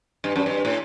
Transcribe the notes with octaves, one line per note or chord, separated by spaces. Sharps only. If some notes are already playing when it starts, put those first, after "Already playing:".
G2
F#2
G2
A2